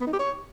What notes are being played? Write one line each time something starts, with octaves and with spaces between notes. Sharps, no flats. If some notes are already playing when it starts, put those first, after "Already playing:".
B3
D#4
G4
C#5